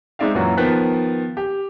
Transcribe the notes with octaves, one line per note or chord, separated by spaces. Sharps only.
G#3 C4 D#4 D5 E5 F5
F#2 A#2 E3 F#3 F4 F#4
D#3 F3 B3 F#6 B6
G4